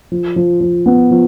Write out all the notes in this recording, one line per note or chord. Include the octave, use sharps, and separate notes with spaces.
F3
F3
F3
B3
F3